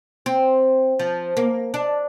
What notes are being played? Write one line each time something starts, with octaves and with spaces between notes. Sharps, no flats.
C4
F3
A#3
D4